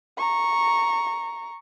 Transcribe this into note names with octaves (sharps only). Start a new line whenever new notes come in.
A#5 C#6